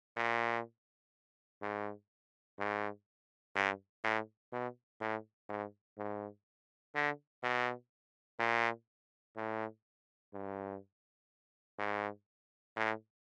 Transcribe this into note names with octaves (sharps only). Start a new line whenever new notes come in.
A#2
G#2
G#2
G2
A2
B2
A2
G#2
G#2
D3
B2
A#2
A2
G2
G#2
A2